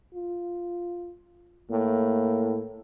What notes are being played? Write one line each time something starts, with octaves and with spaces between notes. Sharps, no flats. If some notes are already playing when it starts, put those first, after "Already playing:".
F4
A2 A#3